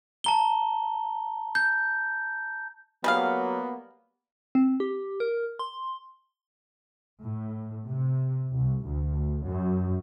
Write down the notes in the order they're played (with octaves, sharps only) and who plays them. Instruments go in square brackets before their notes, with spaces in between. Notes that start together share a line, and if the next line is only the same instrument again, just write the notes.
[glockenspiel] A5 A#5 G7
G6
[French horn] F#3 [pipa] G3 G#4 F5 [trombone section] A#3 B3
[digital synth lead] C4
G4
A#4
C6
[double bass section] A2
C3
C2
D2
F#2